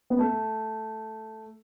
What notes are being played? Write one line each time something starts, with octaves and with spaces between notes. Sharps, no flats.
B3
A3